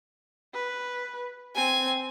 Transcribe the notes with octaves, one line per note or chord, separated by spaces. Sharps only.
B4
C4 G#5